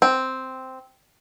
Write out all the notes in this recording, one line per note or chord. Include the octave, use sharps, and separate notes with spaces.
C4